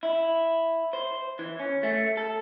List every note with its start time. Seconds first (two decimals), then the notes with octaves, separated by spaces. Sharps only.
0.03 E4
0.93 C5
1.39 E3
1.59 C#4
1.83 A3
2.17 A4